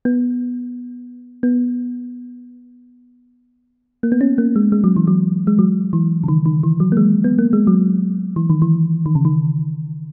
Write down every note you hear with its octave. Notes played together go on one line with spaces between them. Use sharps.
B3
B3
A#3
B3
C#4
A#3
G#3
G#3
F#3
E3
F#3
G#3
F#3
E3
C#3
D#3
D#3
E3
F#3
A#3
G#3
B3
A#3
G#3
F#3
E3
D#3
E3
D#3
C#3
D#3